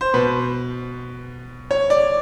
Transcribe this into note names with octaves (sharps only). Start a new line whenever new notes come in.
C5
B2 B4
C#5
D5